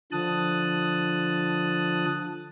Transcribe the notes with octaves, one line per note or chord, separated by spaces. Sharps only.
D3 F3 A5 D#6 F#6